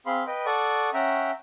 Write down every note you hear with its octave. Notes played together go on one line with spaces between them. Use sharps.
C4 G#4 F5 B5 C6
B4 D#5 G5
A4 D5 F#5 C#6 D#6
C#4 E5 F#5 G5 A#5